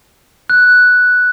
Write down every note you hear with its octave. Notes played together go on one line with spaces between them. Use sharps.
F#6